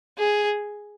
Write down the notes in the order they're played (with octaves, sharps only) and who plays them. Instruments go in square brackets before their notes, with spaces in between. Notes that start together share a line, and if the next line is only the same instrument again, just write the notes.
[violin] G#4